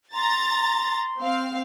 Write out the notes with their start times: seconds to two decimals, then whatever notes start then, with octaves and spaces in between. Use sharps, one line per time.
0.15 A#5 C6 A6
1.19 C4 F5